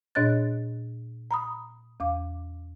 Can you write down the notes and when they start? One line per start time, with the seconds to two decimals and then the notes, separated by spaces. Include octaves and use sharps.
0.15 A#2 D4 C#5 D#5 F#6 A6
1.31 A#5 B5 D#6
2.00 E2 F5 D6